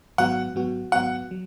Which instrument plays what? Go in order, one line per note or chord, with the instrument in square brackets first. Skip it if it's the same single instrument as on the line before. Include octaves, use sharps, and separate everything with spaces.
[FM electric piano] G#1 G#2 F#3 B3 F#4 [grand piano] F#5
[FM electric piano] G#1 G#2 F#3 B3 F#4
[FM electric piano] G#1 G#2 F#3 B3 F#4 [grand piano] F#5
[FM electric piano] F#3